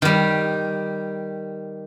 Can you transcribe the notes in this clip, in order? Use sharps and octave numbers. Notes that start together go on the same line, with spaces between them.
D#3 G3